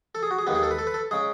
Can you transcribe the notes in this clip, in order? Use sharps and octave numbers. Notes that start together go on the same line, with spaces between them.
A4
G#4
F#4
G#4
D#2 D#3 G#3 B3
G#4
A4
B4
A4
B4
A4
C#3 G#3 G#4